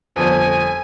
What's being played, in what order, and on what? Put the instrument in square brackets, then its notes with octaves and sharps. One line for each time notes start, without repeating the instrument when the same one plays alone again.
[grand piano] G1 F2 [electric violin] G#5